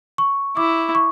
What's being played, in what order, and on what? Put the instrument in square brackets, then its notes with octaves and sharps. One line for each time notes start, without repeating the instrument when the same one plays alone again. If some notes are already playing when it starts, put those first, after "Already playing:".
[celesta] C#6
[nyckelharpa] E4 [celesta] D6
[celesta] C#6